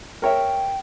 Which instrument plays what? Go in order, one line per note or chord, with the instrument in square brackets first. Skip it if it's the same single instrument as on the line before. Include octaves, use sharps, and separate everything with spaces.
[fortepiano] A#4 C#5 E5 [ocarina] G5